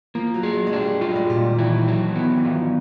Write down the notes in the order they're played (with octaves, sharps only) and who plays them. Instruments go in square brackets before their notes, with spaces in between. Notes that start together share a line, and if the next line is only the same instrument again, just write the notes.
[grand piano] F3 [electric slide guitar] A#3
[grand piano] F#3
[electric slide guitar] G#4
[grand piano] F#3
G#3
[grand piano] G3 [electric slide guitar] D4
[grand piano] G3
[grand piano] F#3 [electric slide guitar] F4
[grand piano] G3
G#3
[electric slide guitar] A#2 [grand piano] G3
[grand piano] D#3
[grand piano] E3 [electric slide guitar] E4
[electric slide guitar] F#3
B3
[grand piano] E3
[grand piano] D#3 [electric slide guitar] F3